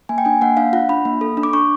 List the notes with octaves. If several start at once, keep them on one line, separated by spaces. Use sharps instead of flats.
A#3 G#5
G5
D4 G#5
A#3 F#5
D4 F5
F4 F#5
D4 B5
A#3
A4
D4
D6
D4 C#6